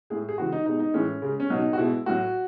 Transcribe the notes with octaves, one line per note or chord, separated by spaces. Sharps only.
A2 G#3 G#4
G#4
C#3 E3 G#3 F#4
D#4
B2 G#3 D#4
D#4
A2 E3 G#3 C#4
C#3 G#3
C#4
B2 F#3 D#4
F#4
B2 G#3 E4
A2 F#3 F#4